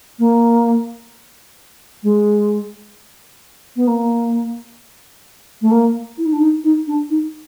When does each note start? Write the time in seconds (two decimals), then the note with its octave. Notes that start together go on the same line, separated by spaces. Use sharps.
0.18 A#3
2.03 G#3
3.76 B3
3.87 A#3
5.61 A3
5.71 A#3
6.17 E4
6.25 D#4
6.32 D4
6.40 D#4
6.63 D#4
6.87 D4
7.09 D#4